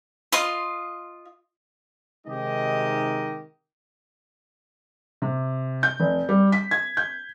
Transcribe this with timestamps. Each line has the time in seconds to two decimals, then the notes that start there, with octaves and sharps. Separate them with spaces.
0.32 F4 D#5 C6
2.27 C3 D#3 G#3 D#4 G4 D#5
5.22 C3
5.83 G6
6.00 F1
6.29 G3
6.52 B6
6.71 G#6
6.97 G6